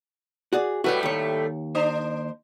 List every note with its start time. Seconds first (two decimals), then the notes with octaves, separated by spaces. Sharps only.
0.53 F#4 G#4 D5
0.84 A2 G3 A3 F#4 B4 C#5
1.03 D#2 C#5
1.75 D4 C5